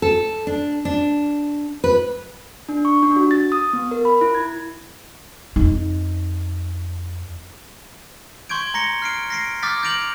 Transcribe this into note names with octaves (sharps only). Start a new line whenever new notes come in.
A4
D4
D4
B4
D4
C#6
D4
F#4
A6
D#6
B3
A#4
B5
E4
G#6
F2 D#4
C6 C#6 G6 G#6 D7
A#5 A#6 C#7 G7
F6 C7 D7
A#6 C7 D7
D6 D#6 F6 G6 A6 B6
G6 A6 A#6 D7 F7 F#7